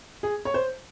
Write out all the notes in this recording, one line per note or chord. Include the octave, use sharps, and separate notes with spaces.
G#4
C#5
C5